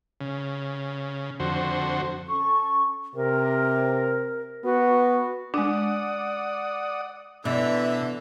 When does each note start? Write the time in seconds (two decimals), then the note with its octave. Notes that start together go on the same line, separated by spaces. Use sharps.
0.21 C#3
1.40 F2 D3 F#4 C5
2.27 C#4 A4 C#6
3.15 C3 A#4
4.64 B3 F#4
5.54 G#3 D4 D5 F#5 D#6
7.45 B2 D3 E3 D5 E5